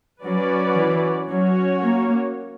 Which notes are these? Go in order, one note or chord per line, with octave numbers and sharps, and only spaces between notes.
F#3 C#4 F#4 B4 D5
E3
F#3 C#4 F#4 C#5
A#3